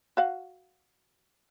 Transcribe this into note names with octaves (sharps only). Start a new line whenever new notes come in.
F#4 F5 F#5